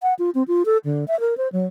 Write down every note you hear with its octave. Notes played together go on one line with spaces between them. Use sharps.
F#5
F4
C4
F4
A4
D3
E5
A#4
C5
F#3